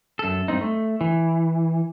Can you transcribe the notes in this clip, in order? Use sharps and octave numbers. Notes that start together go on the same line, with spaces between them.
F#2 A4
G2 C3 C4 D#4
A3
E3